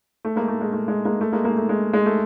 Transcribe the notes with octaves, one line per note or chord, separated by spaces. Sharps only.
A3
G#3 A#3
A3
G#3
A3
G#3
G#3 A#3
A3
G#3 A#3
G#3 A#3
A3
G#3
G#3
A3